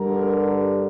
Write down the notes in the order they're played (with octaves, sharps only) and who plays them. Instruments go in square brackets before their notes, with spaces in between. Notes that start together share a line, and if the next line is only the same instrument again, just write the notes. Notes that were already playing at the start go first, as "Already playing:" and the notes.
Already playing: [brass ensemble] G2 D3 G3 A#4